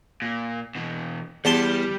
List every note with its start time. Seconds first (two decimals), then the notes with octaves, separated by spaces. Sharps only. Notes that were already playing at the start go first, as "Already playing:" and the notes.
0.22 A#2
0.75 B2 E3
1.45 E2 G3 A5 C6